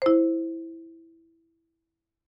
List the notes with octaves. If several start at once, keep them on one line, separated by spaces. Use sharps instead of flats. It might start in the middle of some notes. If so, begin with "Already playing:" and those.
E4 C5